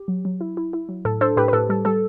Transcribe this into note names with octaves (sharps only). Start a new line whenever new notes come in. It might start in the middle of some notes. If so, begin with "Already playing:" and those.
Already playing: G4
F#3
F#3
E4
E4
E4
F#3
A2 A4
D4 A4 C5
A2 G4 B4
B4
A2 A4
G3 A4
G3 A4